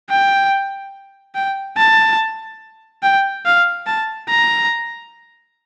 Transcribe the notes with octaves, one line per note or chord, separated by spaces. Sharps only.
G5
G5
A5
G5
F5
A5
A#5